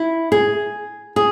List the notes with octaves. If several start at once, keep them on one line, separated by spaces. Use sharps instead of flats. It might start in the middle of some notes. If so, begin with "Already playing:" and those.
Already playing: E4
G#4
G#4